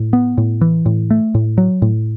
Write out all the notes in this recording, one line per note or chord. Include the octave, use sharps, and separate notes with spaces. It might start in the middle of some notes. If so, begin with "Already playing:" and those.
Already playing: A2
B3
A2
E3
A2
A3
A2
F#3
A2